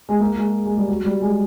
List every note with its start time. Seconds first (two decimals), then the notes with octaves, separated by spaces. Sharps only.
0.09 G#3
0.20 A#3
0.38 G#3
0.66 G#3
0.77 G3
0.88 F#3
1.05 G3
1.22 G#3